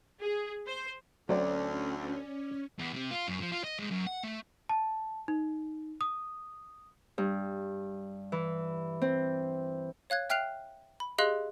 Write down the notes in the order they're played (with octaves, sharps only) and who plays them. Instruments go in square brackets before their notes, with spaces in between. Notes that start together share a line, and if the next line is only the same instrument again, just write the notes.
[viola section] G#4
C5
[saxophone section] D2 [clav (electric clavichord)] F#3 A3 C4 [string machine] C#4 [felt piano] D5
[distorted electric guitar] E2
C3
F4
F#2
F3
F4
D#5
G#2
F#2
F#5
A3
[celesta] A5
D#4
D#6
[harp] G2
E3
C4
[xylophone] C#5 F5 F#6 G#6
E5 G5 F6 F#6 C7 F7
B5
G4 G#4 D#5 F5 C6 F#6